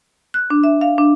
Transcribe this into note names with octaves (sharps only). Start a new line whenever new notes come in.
F#6
D4
E5
F5
D4